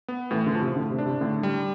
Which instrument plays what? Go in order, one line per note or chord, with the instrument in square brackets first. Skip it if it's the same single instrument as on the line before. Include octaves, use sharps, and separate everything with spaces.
[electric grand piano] B3
[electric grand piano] A2 [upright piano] E3
[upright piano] D3
[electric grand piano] F3
[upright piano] C3
[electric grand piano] A2 [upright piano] D3
[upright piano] C3
[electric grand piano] D4
[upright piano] C3
[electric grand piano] A2 [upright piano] D3
[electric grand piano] G3